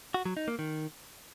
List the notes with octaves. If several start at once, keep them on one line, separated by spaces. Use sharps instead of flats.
F#4
F#3
D#4
A#3
D#3